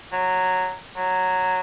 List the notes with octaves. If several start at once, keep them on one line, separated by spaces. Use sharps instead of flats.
F#3
F#3